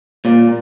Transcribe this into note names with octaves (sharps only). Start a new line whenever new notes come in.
A#2